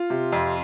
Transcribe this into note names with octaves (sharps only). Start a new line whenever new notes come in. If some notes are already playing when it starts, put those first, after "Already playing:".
Already playing: F4
C3
F2